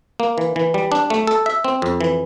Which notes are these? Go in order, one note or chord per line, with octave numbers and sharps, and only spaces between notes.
A#3
E3
E3
G3
D4
A3
A4
E5
C4
F2
E3